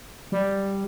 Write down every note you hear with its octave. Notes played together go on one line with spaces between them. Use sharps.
G3